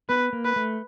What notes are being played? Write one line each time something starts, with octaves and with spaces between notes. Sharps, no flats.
B3 B4
A#3
B4
A3